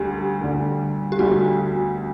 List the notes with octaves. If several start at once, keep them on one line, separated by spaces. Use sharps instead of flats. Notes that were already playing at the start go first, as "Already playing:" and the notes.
Already playing: D2 D3 G3 G4
D2 D3 G3
G4
D2 D3 G3 F#4